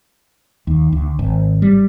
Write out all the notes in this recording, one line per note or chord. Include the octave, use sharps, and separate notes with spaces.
D#2
D2
G#1
G3